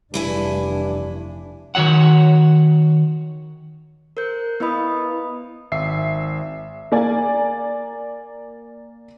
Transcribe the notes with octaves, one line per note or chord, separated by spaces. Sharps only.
F1 G2 E3 D4 E4 G#5
D#3 F#4 C#5 F#5
A#4 C5 G6
B3 E4 B4 D#5 B5 D#6
G#1 E5 C7
A#3 D5 G#5